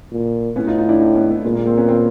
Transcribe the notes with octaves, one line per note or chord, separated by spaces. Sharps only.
A#2
A2 B3 C#4
D#4 F4
D#4 F4
D4 E4
C#4 D#4
B3 C#4
A3 B3
A#2 G#3 A#3
G#3 A#3
A#3 C4
B3 C#4
A#3 C4